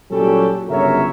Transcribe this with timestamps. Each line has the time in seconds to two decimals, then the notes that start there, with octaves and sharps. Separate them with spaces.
0.11 A#2 F#3 G3 C#4 G4 A4
0.69 G1 C#3 F#3 A#4 C#5 E5